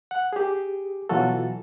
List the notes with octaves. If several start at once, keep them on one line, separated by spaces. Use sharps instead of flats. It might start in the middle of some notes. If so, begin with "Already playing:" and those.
F#5
G4 G#4
B2 E3 F#3 F4 F#4 A4